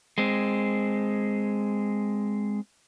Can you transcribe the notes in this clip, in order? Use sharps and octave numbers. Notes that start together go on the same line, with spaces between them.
G#3 C4